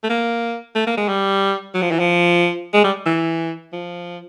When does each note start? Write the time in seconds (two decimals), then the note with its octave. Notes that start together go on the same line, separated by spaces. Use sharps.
0.03 A3
0.10 A#3
0.75 A3
0.87 A#3
0.97 G#3
1.08 G3
1.74 F#3
1.82 F3
1.91 E3
1.99 F3
2.74 G#3
2.84 G3
3.06 E3
3.73 F3